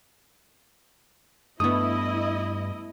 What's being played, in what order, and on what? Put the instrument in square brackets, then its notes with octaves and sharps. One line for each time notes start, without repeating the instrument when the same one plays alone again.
[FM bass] G2 [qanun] A3 B3 [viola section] E4 D#5 [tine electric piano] D#6